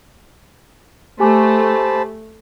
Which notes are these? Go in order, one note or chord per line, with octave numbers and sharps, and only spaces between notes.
A3 G4 C5 G#5 A5 B5 D6